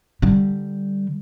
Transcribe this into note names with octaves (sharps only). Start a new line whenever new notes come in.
D3 G3